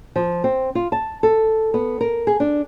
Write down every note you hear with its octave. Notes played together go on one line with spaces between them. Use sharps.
F3
C4
F4
A5
A4
B3
A#4
G#4
D4